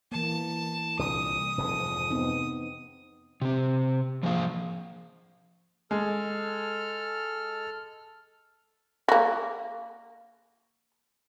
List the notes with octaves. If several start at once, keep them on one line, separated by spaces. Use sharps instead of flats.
E3 A#3 A5
C2 A#2 D3 D#6
F1 F2 G#2
B3 C4 D#4
C3 C4
F3 A#3 G#4 F5
G#3 A4 F6
A#3 F#4